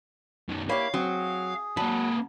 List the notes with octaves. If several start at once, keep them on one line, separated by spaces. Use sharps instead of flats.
F#2 D#3
A#3 E4 G4 C#5 F5 B5
F#3 C4 G#4
F#3 A#3 B4 A5